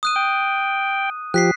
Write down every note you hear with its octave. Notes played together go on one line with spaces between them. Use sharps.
D#6 F#6 D#7
G5
F3 G4 F#6 B6 C7